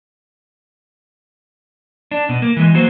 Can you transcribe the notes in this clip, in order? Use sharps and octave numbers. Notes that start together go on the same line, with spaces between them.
D4
B2
A#3
E3 G#3
F#3 A#3 F#4 C5